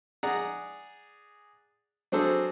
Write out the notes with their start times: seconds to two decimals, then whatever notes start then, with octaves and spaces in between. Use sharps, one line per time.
0.23 G#4 D5 F#5 A#5
2.12 F#3 C4 D4 G#4 A4 C5